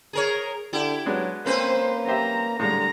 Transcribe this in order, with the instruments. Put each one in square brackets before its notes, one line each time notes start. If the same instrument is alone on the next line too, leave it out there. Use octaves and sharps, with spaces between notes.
[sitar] G#4 A#4 C#5
[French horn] D3 [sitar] E4 G4
[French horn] F#3 [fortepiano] G#3 B3 D4
[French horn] A#3 [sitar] C4 C#4 B4 [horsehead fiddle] C5
[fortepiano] G4 C5 E5 [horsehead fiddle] A#5
[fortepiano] A2 G#3 [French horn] D3 [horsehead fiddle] G3 A#5